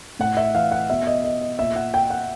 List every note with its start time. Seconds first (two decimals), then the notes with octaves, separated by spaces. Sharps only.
0.19 A2 F#5
0.37 E5
0.54 E3 F5
0.71 F#5
0.90 B2 E5
1.07 D#5
1.24 D#5
1.41 D#5
1.59 A#2 E5
1.76 F#5
1.94 G5
2.10 F#5